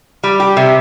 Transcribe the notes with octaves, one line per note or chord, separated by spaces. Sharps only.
G3
G4
C3